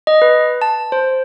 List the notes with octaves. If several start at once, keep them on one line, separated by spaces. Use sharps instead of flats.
D#5
B4
A5
C5